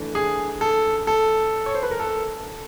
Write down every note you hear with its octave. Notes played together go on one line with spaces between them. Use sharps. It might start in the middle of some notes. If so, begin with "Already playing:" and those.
Already playing: E3 A3 D4
G#4
A4
A4
C#5
C5
B4
A#4
A4